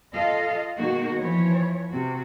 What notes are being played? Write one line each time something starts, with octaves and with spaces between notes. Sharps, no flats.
F4 A4 D#5 F5
B2 D#3 G#3 A#3 D#4 F#4
E3 F3 C#5
C3 F#4